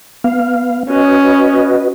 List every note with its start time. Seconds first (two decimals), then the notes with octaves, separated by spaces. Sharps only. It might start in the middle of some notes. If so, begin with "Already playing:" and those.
0.24 B3 F5
0.90 C#4 F#4 B4 D#5